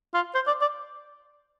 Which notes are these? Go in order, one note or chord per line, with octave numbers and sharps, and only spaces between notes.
F4
C5
D5
D5